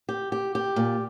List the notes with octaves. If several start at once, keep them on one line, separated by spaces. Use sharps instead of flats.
G4
G4
G4
A#2